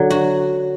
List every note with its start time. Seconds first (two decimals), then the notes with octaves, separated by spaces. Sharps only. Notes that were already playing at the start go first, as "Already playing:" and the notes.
Already playing: D3 F#3
0.10 F#4